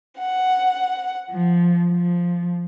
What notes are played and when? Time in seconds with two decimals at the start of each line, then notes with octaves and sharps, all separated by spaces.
0.18 F#5
1.31 F3
1.91 F3